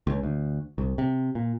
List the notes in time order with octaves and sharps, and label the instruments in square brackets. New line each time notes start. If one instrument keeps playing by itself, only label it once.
[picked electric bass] C#2
D2
C2
C3
A#2